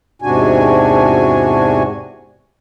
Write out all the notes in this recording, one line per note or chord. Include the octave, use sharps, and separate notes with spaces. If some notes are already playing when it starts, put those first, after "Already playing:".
E2 G#2 C3 D4 F#4 G#5